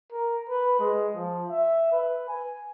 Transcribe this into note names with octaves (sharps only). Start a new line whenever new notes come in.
A#4
B4
G#3
F3
E5
B4
G#5